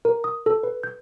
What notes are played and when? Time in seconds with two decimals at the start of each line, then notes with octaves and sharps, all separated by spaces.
0.05 A#4
0.24 D#6
0.46 A4
0.63 B4
0.83 G6